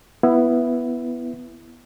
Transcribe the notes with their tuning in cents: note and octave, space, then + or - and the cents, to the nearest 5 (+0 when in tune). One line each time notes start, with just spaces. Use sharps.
B3 +0 E4 +10